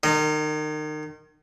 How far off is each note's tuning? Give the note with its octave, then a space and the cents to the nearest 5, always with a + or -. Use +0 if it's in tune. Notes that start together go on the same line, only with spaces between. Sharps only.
D#3 -30 D#5 +5